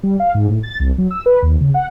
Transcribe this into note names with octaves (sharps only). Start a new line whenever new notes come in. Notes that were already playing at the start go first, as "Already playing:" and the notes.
G3
F5
G#2
A2
A6
C2
F#3
E6
B4
D#2
C#3
F#5